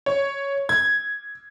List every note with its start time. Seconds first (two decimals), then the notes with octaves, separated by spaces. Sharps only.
0.06 C#5
0.69 G#6